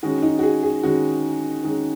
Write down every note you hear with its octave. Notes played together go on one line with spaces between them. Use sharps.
D#3 G#3 C#4 F#4
D#4
F#4
G#4
G#4
D#3 G#3 C#4 F#4
D#3 G#3 C#4